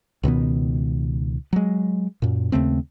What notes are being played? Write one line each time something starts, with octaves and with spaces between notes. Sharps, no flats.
C#2 B2 D#3 B3
F#3 G#3
F#2 A#2
D#2 C#3 A3 C4